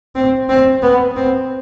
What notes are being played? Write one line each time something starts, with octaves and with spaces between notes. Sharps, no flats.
C4
C4
B3
C4